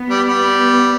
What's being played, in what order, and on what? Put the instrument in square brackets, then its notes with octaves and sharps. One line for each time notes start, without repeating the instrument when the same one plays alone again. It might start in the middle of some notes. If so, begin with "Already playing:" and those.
Already playing: [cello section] B3
[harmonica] G3
G3
[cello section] B3